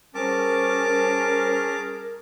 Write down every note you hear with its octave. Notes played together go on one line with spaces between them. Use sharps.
G3 C#4 G#4 A#4 C5 A5 D6 D#6